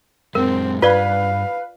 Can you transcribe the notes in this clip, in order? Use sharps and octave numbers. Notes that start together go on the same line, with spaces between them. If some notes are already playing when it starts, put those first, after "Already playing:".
F#2 G#3 C4 A#4
G2 F4 B4 D5 F5